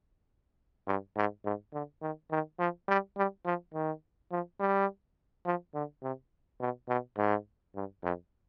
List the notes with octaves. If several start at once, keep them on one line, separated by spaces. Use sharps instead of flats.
G2
G#2
G#2
D3
D#3
D#3
F3
G3
G3
F3
D#3
F3
G3
F3
D3
C3
B2
B2
G#2
G2
F2